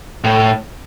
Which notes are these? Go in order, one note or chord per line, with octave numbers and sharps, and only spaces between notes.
A2